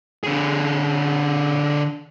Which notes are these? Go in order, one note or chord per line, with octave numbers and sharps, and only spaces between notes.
D3 G#4